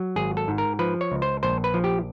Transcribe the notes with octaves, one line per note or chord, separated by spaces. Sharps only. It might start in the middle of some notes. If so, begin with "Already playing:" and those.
Already playing: F#3
G#1 G#4
A4
G#2
A#4
F3 B4
C#5
C#2
C5
A#1 C5
B4
F3
G4